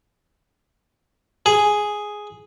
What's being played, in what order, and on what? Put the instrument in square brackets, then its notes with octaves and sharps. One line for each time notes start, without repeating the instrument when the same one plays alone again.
[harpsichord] G#4